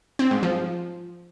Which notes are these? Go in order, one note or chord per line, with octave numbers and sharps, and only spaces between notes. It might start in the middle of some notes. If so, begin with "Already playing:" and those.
C4
G#2
F3